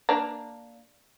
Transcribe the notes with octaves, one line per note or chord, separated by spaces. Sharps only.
A#3 D4